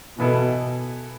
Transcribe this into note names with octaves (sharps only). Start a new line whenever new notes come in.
B2 E3 B3 E4 A4